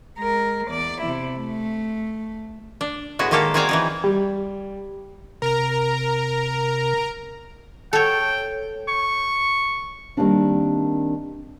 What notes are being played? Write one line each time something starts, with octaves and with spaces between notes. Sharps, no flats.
G#3 A#4
E2 D5
C3 E4
A3
D4
A2 G#3 B3 F#4
D#3 G#3 A#3 G4 A4
C4 F#4 G#4 A#4 C#5 D5
E3 D#4 G#4
G3
C3 A#4 A#5
A4 C#5 G5
C#6
D#3 F3 G3 A#3 C4 D4